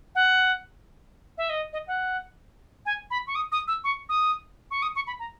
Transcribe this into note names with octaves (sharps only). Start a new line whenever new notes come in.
F#5
E5
D#5
D#5
F#5
G#5
B5
C#6
D#6
D#6
E6
C#6
D#6
C#6
D#6
C#6
B5
A#5